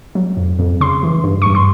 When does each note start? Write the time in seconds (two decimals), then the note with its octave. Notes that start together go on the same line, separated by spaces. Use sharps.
0.15 F#3
0.37 F2
0.59 F2
0.81 C#3 C6
1.03 E3
1.24 G2
1.42 G2 C#6
1.55 C6